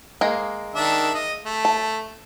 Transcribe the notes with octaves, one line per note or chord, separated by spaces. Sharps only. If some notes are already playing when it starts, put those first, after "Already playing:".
G#3 A#3
D#3 D4 E5
D#5
A3
A5